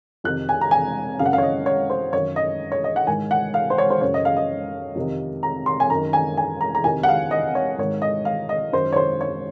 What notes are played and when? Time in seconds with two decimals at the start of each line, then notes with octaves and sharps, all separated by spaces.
0.24 F2 C3 D#3 F#6
0.49 G#5
0.61 A#5
0.71 G#5
1.19 F#2 C#3 F5
1.26 F#5
1.33 F5
1.38 C#5
1.43 D#5
1.66 C#5
1.90 C5
2.13 F#2 D#3 C#5
2.36 D#5
2.72 C#5
2.84 D#5
2.96 F#5
3.07 G#2 D#3 G#5
3.31 F#5
3.54 F5
3.70 C5
3.78 C#5
3.90 C5
4.01 F#2 C#3 C#5
4.14 D#5
4.25 F5
4.37 D#5
4.95 F2 C3 D#3
5.43 A#5
5.66 C6
5.80 G#5
5.90 F#2 D#3 A#5
6.13 G#5
6.37 G#5
6.61 A#5
6.75 A#5
6.84 F2 C3 D#3 G#5
7.03 F#5
7.09 F5
7.31 D#5
7.55 C#5
7.78 G#2 D#3 C#5
8.02 D#5
8.25 F5
8.49 D#5
8.73 F#2 D#3 C5
8.92 C#5
8.96 C5
9.21 C#5